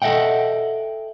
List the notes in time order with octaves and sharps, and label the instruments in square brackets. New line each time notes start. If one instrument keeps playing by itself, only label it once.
[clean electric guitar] A4 D#5 E5 F#5 G5